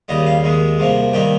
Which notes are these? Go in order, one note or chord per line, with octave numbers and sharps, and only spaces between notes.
D#2 C#3 G3 D#5
F5
D#2 D#3 G#3
C2 C3 F3 A#3
G2 D#3 G3 A#3 G5